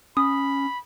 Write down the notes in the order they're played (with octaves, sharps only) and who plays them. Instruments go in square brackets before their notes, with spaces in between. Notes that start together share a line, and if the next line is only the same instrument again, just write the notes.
[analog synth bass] C#4 [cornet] B5 [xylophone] D#6